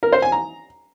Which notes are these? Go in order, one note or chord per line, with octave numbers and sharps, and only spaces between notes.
A#4
C5
G#5
A#5